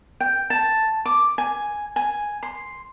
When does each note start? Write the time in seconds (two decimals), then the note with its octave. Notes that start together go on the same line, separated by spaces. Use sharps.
0.21 G5
0.50 A5
1.06 D6
1.38 G#5
1.96 G#5
2.43 C6